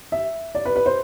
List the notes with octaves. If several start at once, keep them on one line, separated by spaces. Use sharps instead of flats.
E5
D5
B4
B4
C5